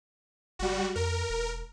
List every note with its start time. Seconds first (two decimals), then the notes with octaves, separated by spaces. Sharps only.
0.59 F#1 G3 F#4
0.95 F2 A#4
1.29 E1